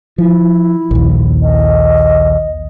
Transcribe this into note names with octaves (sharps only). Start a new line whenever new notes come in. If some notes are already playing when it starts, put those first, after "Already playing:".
F3 E4
A#1 D#2
D#5